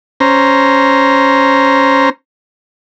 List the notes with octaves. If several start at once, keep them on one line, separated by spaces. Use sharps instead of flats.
C#4 C5 A#5